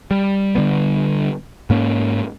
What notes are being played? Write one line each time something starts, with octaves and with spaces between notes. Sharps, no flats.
G3
D3 G3 B3
G#2 A#3 C#4